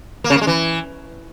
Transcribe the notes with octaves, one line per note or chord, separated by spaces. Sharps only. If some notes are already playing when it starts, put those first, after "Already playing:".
A#3
C#3
A#3
G#3
E3